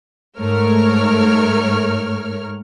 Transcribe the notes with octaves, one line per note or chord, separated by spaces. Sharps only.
G#2 A3 A#4 C#5 F6